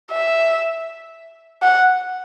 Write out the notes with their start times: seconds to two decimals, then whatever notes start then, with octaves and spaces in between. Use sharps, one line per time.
0.11 E5
1.62 F#5